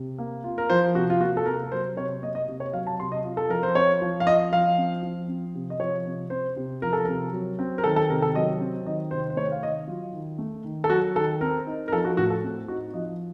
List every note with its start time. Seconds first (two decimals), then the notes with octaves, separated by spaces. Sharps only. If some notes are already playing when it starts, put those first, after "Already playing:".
Already playing: C3
0.18 A#3
0.44 F4
0.58 A#4
0.70 F3 C5
0.95 C3 F#4
1.10 F4
1.20 A#3 F#4
1.37 A4
1.46 C3 A#4
1.64 A#4
1.72 F#3 C5
1.96 C3 C#5
2.22 A#3 D#5
2.35 D#5
2.48 C3
2.60 C#5
2.73 F#3 F5
2.87 A5
2.99 C3 C6
3.12 D#5
3.24 F4
3.37 A4
3.49 F3 A#4
3.63 C5
3.75 C4 C#5
4.02 F3
4.20 F5
4.27 F4 D#5
4.52 F3 F5
4.77 C4
5.03 F3
5.28 C4
5.54 C3
5.70 D#5
5.79 F3 C#5
6.05 C3
6.30 C4 C5
6.56 C3
6.82 F3 A#4
6.93 A4
7.05 C3 A#4
7.33 F#3
7.59 C4
7.78 A#4
7.84 D#3 A4
7.96 A4
8.09 C3 A#4
8.22 A4
8.35 F#3 D#5
8.60 C4
8.85 D#3 D#5
9.11 C3 C5
9.30 C5
9.36 A3 C#5
9.52 F5
9.62 D#3 D#5
9.87 F#3 F4
10.13 D#3
10.38 A3
10.64 D#3
10.84 A4
10.90 F#3 F#4
11.16 D#3 A4
11.41 C4 A#4
11.67 D#4
11.88 A#4
11.92 F3 A4
12.05 F#4
12.17 A2 F#4
12.30 A4
12.43 C4
12.68 D#4 F#4
12.94 F3 D#5